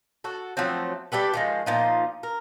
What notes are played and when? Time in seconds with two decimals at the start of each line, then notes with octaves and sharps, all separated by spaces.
0.24 F#4 A4
0.57 F3 F#3 A3 C4
1.12 G3 G4 A4 B4
1.34 D#3 F3 G#3
1.66 A#2 F3 D#4
2.23 A#4